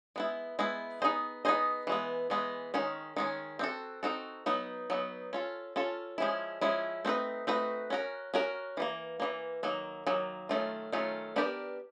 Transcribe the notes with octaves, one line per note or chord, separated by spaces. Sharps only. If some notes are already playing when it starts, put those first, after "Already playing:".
G#3 B3 E4
G#3 B3 E4
B3 D#4 G#4 C5 D#5
B3 D#4 G#4 C5 D#5
E3 G#3 B3
E3 G#3 B3
D#3 G#3 C#4
D#3 G#3 C#4
C4 D#4 F#4 A4
C4 D#4 F#4 A4
F#3 B3 D#4
F#3 B3 D#4
C#4 F4 A4
C#4 F4 A4
F3 G#3 C#4 E4
F3 G#3 C#4 E4
A3 C4 D#4 F#4 B4
A3 C4 D#4 F#4 B4
C#4 F#4 A#4
C#4 F#4 A#4
E3 G3 A#3
E3 G3 A#3
D#3 F#3 A#3
D#3 F#3 A#3
D#3 F#3 A3 C#4 F4
D#3 F#3 A3 C#4 F4
B3 D4 G4 A#4 D5